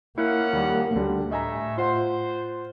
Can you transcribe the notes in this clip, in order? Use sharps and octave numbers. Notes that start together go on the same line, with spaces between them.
A#2 A#3 C#4 E4 F#5
D#2 G3
D2 D3 G3
A2 G3 A3 D#5 E5 G#5 A#5
F4 C5 F#5 C6